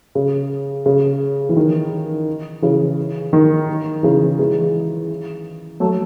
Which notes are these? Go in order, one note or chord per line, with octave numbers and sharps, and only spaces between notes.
C#3
C#3
E3
D#3
C#3 E3
D#3
C#3 E3
E3 G#3
F#3 A3